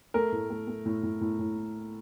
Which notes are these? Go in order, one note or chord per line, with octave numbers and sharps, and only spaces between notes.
A3 A#4
A2
A3
A3
A2
A2
A2
A2